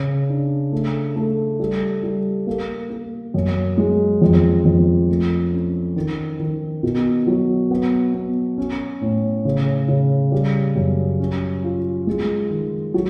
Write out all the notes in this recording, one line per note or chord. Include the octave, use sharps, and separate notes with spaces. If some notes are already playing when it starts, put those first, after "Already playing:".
Already playing: C#3
D4
A3
A3
G3
G3
A#3
A#3
F#2
G#3
F2
F2
A3
C#4
D#3
D#3
B2
F#3
B3
B3
C#4
A2
C#3
C#3
G3
F#2
C#4
F4
G#3
D#3
F#3